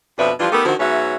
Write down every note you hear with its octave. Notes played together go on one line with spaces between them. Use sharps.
F2 B2 F3 D4 B4 E5
E3 F3 G3 D4 F4
A3 B3 D#4 G4 A4 A#4
D3 D#3 F3 C4 F#4
G#2 F#3 B3 C#4 E5